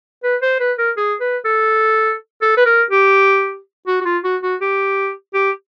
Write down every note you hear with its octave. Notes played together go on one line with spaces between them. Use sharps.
B4
C5
B4
A#4
G#4
B4
A4
A4
B4
A#4
G4
F#4
F#4
F4
F#4
F#4
G4
G4